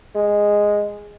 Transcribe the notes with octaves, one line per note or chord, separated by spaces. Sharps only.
G#3